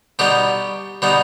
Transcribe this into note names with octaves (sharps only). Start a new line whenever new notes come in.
B2 G3 B3 D#4 G4
B2 G3 B3 D#4